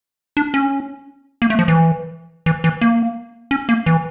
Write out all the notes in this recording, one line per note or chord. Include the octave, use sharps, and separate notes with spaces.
D4
C#4
A#3
A3
F3
E3
E3
E3
A#3
C#4
A#3
E3